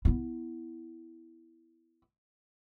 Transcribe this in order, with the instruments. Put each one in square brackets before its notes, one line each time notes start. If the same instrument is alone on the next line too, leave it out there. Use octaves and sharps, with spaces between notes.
[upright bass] B3 E4